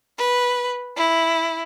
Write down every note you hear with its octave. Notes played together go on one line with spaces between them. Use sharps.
B4
E4